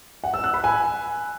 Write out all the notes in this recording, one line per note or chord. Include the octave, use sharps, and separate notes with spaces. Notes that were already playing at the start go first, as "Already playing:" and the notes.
F#5
E6
F#6
B5
G#5